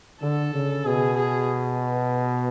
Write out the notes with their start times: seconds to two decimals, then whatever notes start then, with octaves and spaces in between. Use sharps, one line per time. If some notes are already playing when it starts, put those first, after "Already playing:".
0.23 D3 A4
0.54 C#3
0.86 B2 G#4
1.17 G#4